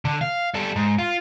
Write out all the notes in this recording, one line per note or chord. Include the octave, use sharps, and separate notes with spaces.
D3
F5
G3 A4
G#2
F4